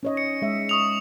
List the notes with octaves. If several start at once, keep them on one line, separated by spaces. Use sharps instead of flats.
C#4 C#5 D#5
C#7
G#3 E5
C#6 D#6 F7